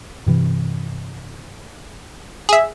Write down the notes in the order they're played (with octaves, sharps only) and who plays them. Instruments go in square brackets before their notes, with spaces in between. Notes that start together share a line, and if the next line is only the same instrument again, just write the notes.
[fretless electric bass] G2 C3 E3
[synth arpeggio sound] G#4 E5